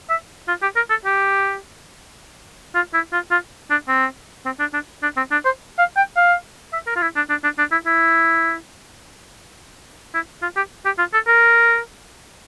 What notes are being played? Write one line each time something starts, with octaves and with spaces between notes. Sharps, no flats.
E5
F4
G4
A#4
A4
G4
F4
E4
F4
F4
D4
C4
C4
D4
D4
D4
C4
D4
C5
F5
G5
F5
E5
A#4
F4
E4
D4
D4
D4
D4
E4
E4
E4
F4
G4
G4
F4
A4
A#4